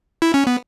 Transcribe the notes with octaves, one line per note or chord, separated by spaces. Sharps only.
E4
C#4
B3